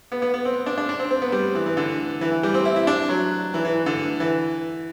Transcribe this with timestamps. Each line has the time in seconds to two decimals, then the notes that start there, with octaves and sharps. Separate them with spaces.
0.12 B3
0.22 B3
0.34 B3
0.45 C4
0.66 D4
0.78 D4
0.89 D4
0.99 C4
1.11 C4
1.22 B3
1.32 G3
1.55 E3
1.66 E3
1.77 D3
2.21 E3
2.31 E3
2.43 G3
2.54 C4
2.65 E4
2.76 E4
2.87 D4
3.09 F#3
3.54 E3
3.65 E3
3.86 D3
4.20 E3